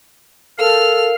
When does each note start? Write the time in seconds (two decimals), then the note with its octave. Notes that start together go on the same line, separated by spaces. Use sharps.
0.58 A4 A#4 F5 F6